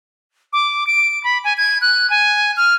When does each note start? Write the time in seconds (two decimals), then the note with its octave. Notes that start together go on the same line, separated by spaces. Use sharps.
0.53 D6
0.87 D7
1.24 B5
1.44 G#5
1.57 G#6
1.81 F#6
2.10 G#5
2.57 F6